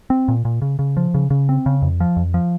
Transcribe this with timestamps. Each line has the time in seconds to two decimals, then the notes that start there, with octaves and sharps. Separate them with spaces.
0.10 C4
0.28 A#2
0.45 A#2
0.62 C#3
0.79 C#3
0.97 F3
1.14 C#3
1.30 C#3
1.49 C4
1.66 C#3
1.82 F2
2.00 F3
2.17 F2
2.34 F3